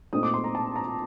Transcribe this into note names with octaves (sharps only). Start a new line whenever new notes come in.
A#2 A3 C4 D#4 D#6
D6
C6
A#5
A5
A#5